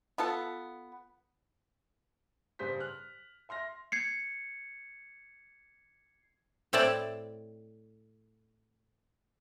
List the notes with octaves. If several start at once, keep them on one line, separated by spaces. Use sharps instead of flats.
B3 F4 A4 A5
G2 C#3 G#4 C5 B6
F6 F#6
E5 C6 F6 A#6
G#6 C7 C#7
A2 C4 E4 D5 A5